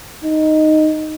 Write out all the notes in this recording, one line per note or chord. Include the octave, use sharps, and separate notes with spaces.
D#4